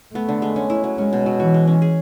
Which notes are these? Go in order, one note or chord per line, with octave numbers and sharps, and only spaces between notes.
A3 B3
D3
G#3
C#4
E4
F#3
G#3 C#4
B2
F#3
E3 F#4
G#3
C#4
G#4